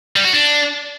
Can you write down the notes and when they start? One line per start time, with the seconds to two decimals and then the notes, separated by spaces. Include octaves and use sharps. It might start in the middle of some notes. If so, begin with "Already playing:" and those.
0.16 G3
0.25 F#4
0.33 D4